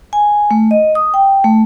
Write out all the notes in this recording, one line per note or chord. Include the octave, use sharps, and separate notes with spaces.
G#5
A3
D#5
D#6
G5
A3